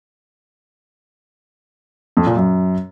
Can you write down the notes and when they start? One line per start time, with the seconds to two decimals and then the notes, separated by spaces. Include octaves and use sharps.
2.17 F2
2.27 A#2
2.36 F#2